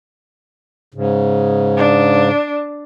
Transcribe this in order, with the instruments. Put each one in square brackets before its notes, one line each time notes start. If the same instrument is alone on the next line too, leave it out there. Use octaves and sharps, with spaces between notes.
[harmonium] G#2 C#3
[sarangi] D4